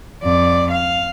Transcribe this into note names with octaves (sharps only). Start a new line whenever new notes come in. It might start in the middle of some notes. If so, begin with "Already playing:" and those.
F2 D5
F5